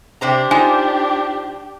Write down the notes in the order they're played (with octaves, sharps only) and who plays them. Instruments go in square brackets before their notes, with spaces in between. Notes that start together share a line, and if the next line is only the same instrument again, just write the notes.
[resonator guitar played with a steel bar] C3 C5 A#5 [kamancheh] D4 G4
[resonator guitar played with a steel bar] D#4 F4 C5 [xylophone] G#5